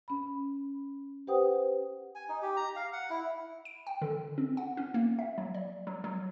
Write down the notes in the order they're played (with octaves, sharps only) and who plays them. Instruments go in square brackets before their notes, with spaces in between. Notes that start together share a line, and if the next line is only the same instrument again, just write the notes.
[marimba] C#4 B5
G4 B4 C5 F#5 G5 D#6
[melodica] G#5
D#4
G4
A#5
F5
F#5
E4
[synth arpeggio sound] D7
G5
D3
C4
F#5
C#4
A#3
E5
F#3
D5
F#3
F#3